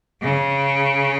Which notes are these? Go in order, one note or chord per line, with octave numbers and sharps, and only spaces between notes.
C#3